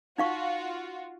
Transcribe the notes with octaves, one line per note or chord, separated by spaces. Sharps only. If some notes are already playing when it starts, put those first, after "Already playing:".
D#4 F4 F#4 F5 C#6